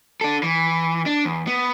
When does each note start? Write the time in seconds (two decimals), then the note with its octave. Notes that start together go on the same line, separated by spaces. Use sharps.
0.21 D4 A4
0.43 E3
1.06 D4
1.25 E2
1.47 B3